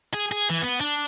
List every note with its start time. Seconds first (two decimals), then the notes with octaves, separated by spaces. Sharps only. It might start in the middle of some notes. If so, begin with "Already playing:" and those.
0.14 G#4
0.32 G#4
0.49 E3
0.62 B3
0.81 D4